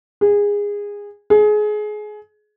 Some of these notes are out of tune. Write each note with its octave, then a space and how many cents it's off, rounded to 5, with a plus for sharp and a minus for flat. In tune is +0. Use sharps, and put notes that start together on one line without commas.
G#4 -20
G#4 +25